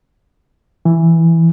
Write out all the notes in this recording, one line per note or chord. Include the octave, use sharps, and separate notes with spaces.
E3